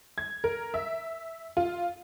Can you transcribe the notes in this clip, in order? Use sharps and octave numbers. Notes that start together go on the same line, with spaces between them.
G#6
A#4
E5
F4